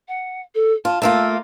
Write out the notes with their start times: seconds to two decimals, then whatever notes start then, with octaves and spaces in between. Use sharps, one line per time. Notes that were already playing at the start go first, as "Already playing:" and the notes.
0.08 F#5
0.55 A4
0.85 F4 A5
1.02 A3 A#3 F4 E6